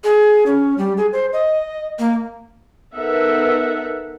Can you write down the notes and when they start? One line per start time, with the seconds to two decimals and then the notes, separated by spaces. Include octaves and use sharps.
0.04 G#4
0.46 C#4
0.78 G3
0.97 G#4
1.13 C5
1.33 D#5
1.99 A#3
2.94 B3 D#4 A4 A#4 E5 F#5